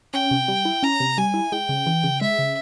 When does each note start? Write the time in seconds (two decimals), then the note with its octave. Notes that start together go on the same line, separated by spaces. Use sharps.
0.13 C#4 G5
0.31 C3
0.48 G3
0.65 E4
0.83 C#4 A#5
1.00 C3
1.17 G3 G#5
1.34 E4
1.52 G#3 G5
1.69 C#3
1.86 E3
2.04 C#3
2.21 G#3 E5
2.39 C#3